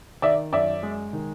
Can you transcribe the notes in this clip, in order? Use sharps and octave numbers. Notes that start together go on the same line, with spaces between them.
D#3 D5 E5
F#2 D5 E5
G#3
D#3